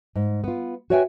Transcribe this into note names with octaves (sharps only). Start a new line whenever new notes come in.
G#2
B3 F4
F#4 B4 C#5 E5 G5 G#5